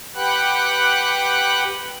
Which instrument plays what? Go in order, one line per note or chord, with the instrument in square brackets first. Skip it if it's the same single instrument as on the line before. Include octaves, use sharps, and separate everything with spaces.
[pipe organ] G4 B4 F#5 G5 B5 F#6